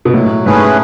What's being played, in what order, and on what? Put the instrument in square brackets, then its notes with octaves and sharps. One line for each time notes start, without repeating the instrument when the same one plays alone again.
[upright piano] B2
[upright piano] A2 [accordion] F#3
[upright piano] G#2 [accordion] A3 C#4 G#4 B4